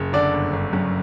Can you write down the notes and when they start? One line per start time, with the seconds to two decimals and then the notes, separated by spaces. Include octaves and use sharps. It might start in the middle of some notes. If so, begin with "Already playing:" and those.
Already playing: F#1
0.13 D3 D5
0.33 G1
0.53 G1
0.73 F#2